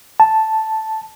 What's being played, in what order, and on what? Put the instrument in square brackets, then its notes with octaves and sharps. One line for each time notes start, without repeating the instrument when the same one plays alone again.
[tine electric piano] A5